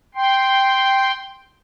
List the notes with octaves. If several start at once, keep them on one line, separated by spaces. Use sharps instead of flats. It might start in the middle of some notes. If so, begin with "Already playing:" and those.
G5 C6